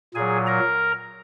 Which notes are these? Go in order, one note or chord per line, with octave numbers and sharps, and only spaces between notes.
A#2 F#3 G#4 G#5
A#4 A#5